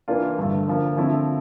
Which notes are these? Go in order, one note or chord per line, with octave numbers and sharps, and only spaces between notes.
E3 A#3 D4 F4
G2 D3 A3
D3 F3 A#3
D3 F3 A3 C4 E4